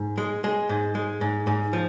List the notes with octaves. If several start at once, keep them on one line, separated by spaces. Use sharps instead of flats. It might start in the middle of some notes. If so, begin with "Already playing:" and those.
Already playing: G#2
G#3
G#3
G#2
G#3
G#2
G#2
F3